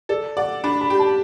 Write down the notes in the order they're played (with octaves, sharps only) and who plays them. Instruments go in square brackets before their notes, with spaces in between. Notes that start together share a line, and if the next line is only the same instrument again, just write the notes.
[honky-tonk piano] A4 [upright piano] D5
[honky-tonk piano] D5 [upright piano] F#5
[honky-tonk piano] D4 [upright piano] B5
[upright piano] B5
[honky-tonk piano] G4
[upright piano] A5